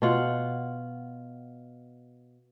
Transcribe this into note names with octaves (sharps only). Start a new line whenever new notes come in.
B2 F4 F#5